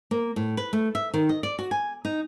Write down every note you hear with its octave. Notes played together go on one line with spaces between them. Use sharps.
A#3
A2
B4
A3
E5
D#3
D#5
D5
F#4
G#5
D#4